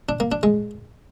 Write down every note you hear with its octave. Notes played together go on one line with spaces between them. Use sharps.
D4
A#3
D4
G#3